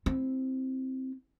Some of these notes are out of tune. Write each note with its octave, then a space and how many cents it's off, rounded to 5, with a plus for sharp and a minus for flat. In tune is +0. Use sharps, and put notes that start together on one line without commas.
C4 +0 E4 +0